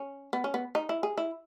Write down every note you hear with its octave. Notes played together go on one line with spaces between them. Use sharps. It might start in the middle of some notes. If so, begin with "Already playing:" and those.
Already playing: C#4
B3
C#4
B3
D#4
E4
G#4
E4